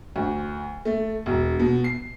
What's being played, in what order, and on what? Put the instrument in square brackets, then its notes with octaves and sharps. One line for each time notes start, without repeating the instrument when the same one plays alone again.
[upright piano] D2
A3
E1
B2
C7